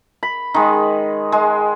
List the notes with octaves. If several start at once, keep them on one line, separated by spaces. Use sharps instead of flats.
B5
D#3 G#3
G#3